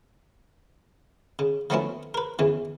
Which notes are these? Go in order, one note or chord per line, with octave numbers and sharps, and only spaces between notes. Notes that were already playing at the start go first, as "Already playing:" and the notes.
C#3
F3 F#3 A3 B3 C#4 E4
A#4 B4
E2 C#3 E3